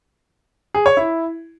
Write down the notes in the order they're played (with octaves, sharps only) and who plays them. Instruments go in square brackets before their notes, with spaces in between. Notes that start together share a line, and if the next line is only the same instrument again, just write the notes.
[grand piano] G#4
C#5
E4